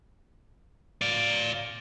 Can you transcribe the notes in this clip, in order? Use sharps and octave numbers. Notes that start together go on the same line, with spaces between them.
D5 F5